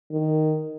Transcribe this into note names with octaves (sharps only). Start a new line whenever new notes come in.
D#3